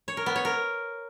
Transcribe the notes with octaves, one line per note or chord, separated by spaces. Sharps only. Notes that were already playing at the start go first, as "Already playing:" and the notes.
C#5
A#4
B3
C#5
A#4